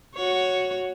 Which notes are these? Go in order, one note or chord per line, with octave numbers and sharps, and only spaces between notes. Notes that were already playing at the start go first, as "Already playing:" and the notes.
F#4 C#5